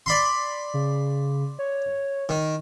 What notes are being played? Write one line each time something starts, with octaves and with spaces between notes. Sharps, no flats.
D5 B5 C6
C#3
C#5
D#3